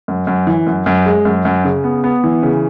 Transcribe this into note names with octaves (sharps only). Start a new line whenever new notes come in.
F#2
F#2
E3
F#2
F#2
G#3
F#2
F#2
C#3
B3
B3
E3
C#3